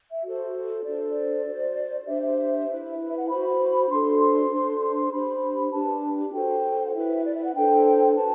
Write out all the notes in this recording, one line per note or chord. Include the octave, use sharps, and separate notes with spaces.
E5
F#4 A4 C5
D4 A4 C5 D5
D5
F#4 C5
D4 G4 C5 E5
E5
E5
E4 B4
E5
F#5
F#4 C5 B5
D4 F#4 A4 C5 C6
C6
D4 A4 C5
C6
C6
D4 G4 C5 B5
D4 G4 B4 A5
F#4 A4 C5 G5
F#5
E4 B4 E5
D5
E5
F#5
D4 A4 C5 G5
F#4 B4 A5